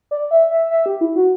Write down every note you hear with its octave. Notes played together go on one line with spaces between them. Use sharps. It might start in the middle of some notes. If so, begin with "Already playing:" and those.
D5
E5
E5
E5
G4
E4
F#4